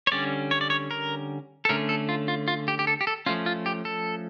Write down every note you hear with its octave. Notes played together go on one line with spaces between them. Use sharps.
C#5
D3 G3 C#4 D5
C#5
D5
C#5
A#4
A4
D3 A3 C#4 A#4
A4
F4
F4
F4
G4
G4
A4
G4
A4
F3 A3 C#4 F4
F4
G4
A4